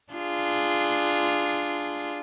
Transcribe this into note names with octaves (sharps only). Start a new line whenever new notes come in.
D4 F4 G#4